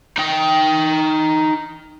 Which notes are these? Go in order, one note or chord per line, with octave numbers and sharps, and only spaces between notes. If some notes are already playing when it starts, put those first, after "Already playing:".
D#4 G5